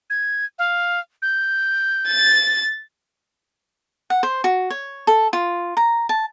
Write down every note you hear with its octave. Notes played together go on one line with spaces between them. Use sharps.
G#6
F5
G6
A6
F#5
C5
F#4
C#5
A4
F4
A#5
A5